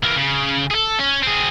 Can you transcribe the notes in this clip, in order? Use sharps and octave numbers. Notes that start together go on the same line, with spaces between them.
E3 A#3
C#3
G#4 A4
C#4
C4 G#4